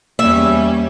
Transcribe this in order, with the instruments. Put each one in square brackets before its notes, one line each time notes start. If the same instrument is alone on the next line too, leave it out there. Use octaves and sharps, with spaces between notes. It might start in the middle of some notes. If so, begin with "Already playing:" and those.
[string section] E2 G3 C#4 [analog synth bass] A#3 [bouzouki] E5